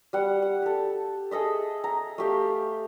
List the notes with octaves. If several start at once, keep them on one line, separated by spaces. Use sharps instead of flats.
G3 F#5
F#5
G4 A4
G#4 A4 D#5 E5
A#5
A3 G4 F5